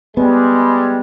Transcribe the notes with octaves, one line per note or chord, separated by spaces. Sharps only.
G3 G#3 B3